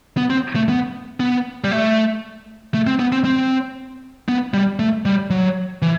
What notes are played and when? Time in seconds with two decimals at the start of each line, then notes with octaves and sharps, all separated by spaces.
0.17 B3
0.30 C4
0.56 A3
0.69 B3
1.20 B3
1.64 G3
1.71 A3
2.74 A3
2.87 C4
2.99 B3
3.12 C4
3.25 C4
4.28 B3
4.54 G3
4.79 A3
5.05 G3
5.30 F#3
5.82 E3